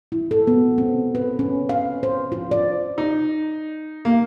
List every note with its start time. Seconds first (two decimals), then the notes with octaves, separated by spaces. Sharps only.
0.12 E4
0.31 A4
0.47 B3
0.78 C4
1.15 B4
1.39 C#4
1.69 F5
2.03 C5
2.32 F4
2.51 D5
2.98 D#4
4.05 A#3